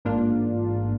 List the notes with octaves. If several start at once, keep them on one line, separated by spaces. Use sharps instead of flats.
A1 G#2 A#3 D4 F4